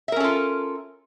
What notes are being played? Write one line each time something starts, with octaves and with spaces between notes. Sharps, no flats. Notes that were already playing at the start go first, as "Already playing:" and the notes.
C#4 F4 A4 A#4 E5